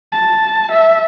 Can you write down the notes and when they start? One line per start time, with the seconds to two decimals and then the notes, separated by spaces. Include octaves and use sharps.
0.12 A5
0.71 E5